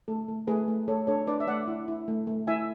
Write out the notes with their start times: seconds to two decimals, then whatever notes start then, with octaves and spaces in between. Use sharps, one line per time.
0.08 A3 A4
0.28 A3
0.47 A3 G#4 B4
0.68 A3
0.88 A3 A4 C#5
1.07 D4 A4 C#5
1.27 D4 B4 D5
1.40 E5
1.47 A3 D5 F#5
1.68 E4
1.88 E4
2.08 A3
2.27 A3
2.47 E4 E5 G#5